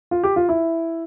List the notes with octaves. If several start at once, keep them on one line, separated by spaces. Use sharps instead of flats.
F4
G4
F4
E4